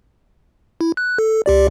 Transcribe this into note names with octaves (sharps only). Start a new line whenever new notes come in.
E4
F#6
A4
C#2 G4 D5